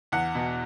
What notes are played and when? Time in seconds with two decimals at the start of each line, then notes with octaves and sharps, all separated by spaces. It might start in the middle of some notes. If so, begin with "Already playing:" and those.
0.12 E2 F#5
0.35 B2